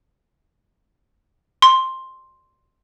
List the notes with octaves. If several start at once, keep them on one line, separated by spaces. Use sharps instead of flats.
C6